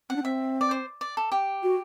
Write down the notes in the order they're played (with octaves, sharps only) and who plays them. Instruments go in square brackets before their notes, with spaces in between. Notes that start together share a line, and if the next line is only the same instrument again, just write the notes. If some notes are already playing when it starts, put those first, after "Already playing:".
[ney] C4 [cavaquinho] F#5
[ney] D4
[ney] C4 [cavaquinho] E5
[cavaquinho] D5
C5
D5
A4
G4
[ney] F#4